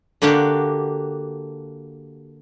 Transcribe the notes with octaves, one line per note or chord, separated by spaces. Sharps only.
D3 A#3 D4 F#4 G4